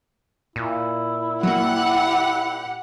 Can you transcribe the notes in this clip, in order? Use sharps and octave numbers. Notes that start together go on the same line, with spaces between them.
A#2 E4
F#3 A#3 G4 F#5